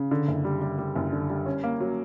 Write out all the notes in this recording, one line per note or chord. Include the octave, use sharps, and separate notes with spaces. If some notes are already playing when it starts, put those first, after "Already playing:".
Already playing: C#3
D3
F#1
G3
G3
G3
F#1
D3
G3
C#4
A#3
F#3